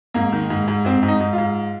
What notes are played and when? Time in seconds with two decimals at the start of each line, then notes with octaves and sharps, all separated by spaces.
0.14 G#2 A#3
0.32 D#3
0.50 G#2
0.68 G#2
0.85 G#2 C4
1.03 G#2
1.08 D#4
1.21 G#2
1.33 F4
1.38 G#2